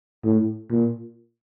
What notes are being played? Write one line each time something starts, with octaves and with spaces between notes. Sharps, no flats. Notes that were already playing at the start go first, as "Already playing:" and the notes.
A2
A#2